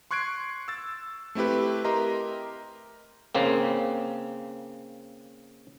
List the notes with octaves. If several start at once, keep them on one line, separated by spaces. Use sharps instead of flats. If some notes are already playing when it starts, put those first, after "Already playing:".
C6 C#6 F#6 G#6 C7 D7
E6 A6
A3 C4 E4 G4 B4
G4 A#4 D#5 E5 A#5 C6
C#3 A#3 C4